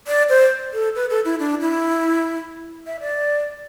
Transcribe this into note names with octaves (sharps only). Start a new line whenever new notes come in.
D5
C5
A4
B4
A4
E4
D4
E4
E5
D5